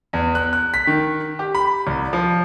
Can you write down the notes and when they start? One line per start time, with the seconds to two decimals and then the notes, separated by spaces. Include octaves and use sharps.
0.13 E2
0.35 F#6
0.53 F#6
0.74 B6
0.87 D#3
1.39 G4
1.55 B5
1.87 C2
2.13 F3